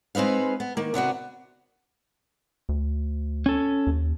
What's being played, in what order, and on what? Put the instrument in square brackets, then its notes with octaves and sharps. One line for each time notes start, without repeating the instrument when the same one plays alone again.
[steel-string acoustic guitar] G#3 C4 D#4 B4 F5
B3
D#3 A#3
C3 B3 D4 F#4
[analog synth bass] D2
[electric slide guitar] C#4 A4
[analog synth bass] D#2